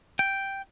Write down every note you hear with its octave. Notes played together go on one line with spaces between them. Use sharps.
G5